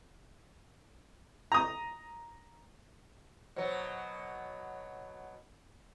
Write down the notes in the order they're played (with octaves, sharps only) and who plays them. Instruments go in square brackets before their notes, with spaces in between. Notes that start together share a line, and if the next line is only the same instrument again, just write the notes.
[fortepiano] A#5 D#6
[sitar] B2 F#3 [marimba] C5